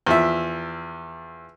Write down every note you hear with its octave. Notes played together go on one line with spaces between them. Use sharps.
E2 F3 E5